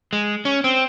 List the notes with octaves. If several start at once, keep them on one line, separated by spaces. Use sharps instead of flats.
G#3
C#4
C4